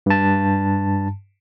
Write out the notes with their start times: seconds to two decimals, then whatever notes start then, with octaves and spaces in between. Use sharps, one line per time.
0.06 G2 A5